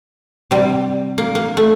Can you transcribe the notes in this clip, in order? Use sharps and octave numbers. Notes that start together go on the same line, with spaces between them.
C3 G3
A#3
A#3
A3